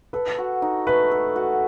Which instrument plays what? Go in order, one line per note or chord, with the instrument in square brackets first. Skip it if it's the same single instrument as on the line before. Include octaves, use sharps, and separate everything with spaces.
[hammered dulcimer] A4 [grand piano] B4
[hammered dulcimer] F#4
D#4
[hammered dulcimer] A3 [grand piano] B4
[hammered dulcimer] A4
F#4